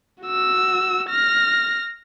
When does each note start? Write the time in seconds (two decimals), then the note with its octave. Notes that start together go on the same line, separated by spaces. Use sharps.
0.22 F#4 E6
1.09 F6 A#6